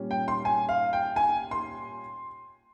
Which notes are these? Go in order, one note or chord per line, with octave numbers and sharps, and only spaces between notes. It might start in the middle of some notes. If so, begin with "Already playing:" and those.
Already playing: A#2 G3 C#4
G5
C6
G#5
F5
G5
G#5
C6